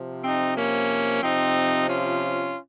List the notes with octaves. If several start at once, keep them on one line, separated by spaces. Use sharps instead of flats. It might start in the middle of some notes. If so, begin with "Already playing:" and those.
Already playing: C3 F3
C4 D#4
A#3 C#4
C3 F3 C4 D#4
C#4 F4